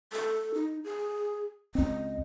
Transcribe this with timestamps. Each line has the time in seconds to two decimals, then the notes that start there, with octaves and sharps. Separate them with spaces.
0.13 A4
0.55 D#4
0.84 G#4
1.75 C#2 C4 D#5